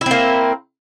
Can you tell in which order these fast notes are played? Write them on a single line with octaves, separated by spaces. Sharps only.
E4 C4 A#3